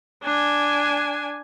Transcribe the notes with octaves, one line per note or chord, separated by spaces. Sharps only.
D4 G#5